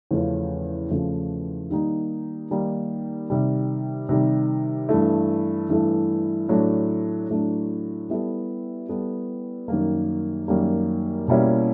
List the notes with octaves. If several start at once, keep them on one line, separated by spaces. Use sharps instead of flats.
E2 C#3 F3 A3 C#4
E2 C#3 F3 A3 C#4
D#3 G3 A#3 D#4
D#3 G3 A#3 D#4
C3 D#3 G3
C3 D#3 G3
G2 E3 A3
G2 E3 A3
A2 F#3 A3 D4
A2 F#3 A3 D4
G3 B3 E4 A4
G3 B3 E4 A4
F#2 D#3 G3 A#3
F#2 D#3 G3 A#3
B2 G3 A#3 C#4 E4